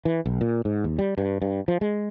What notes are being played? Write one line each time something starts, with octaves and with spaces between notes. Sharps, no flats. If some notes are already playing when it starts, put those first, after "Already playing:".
E3
B1
A#2
G#2
D#2
G3
G2
G2
F3
G#3